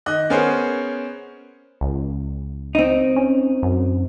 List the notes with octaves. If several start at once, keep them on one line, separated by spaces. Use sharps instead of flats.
D#3 D#5 F#6
B3 C#4 G#4 A#4 C5
C#2
C4 D#4
C#4
F#2